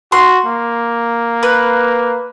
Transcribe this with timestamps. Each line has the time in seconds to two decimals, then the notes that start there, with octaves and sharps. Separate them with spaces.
0.12 F#4 C6
0.46 A#3
1.43 B4